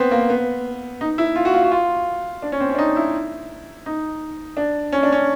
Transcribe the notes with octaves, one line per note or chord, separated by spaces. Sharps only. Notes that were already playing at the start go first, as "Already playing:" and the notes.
Already playing: B3 C4
A#3
B3
D#4
E4
F4
F#4
F4
F#4
F4
D4
C#4
C4
C#4
D4
D#4
E4
D#4
D4
C#4
D4
C#4